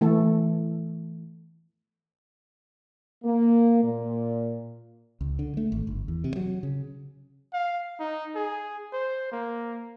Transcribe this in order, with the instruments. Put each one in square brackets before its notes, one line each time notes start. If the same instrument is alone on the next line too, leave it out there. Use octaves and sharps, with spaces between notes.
[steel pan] E3 A3 A4
[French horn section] A#3
A#2
[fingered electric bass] C#2
D3
A3
G#1
G1
E2
C3
F#3
C#3
[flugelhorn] F5
D#4
G#4
C5
A#3